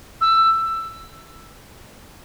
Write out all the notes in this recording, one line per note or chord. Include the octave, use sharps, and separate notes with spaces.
E6